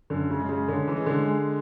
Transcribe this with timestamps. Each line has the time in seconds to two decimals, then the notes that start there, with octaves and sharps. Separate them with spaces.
0.10 F#2 D3
0.30 C#3
0.40 G#3
0.49 C#3
0.68 D3 C#4
0.88 E3
0.97 G#3
1.06 D3
1.27 G#3